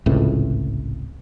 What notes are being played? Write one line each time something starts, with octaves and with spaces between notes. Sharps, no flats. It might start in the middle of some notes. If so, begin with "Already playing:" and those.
G#1 C#2 A2 C3